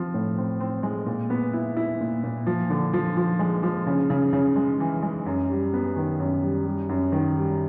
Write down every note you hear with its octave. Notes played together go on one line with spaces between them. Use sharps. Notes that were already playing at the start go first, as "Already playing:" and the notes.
Already playing: F3 C4
A2
C4
C4
G#3
A#2
B3
E4
E4
A#2
A#2
F3
D3
F3
F3
G#3
F3
C#3
C#3
C#3
G#3
E3
G#3
F#2
G3
B3
D#3
F#2
G3
G3
F#2
D#3
G3